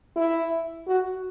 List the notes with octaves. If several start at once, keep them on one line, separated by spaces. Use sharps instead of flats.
E4
F#4